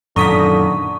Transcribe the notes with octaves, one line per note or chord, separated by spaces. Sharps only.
F#2 A#2 D3 D#3 A#5 C#6 D#6 B6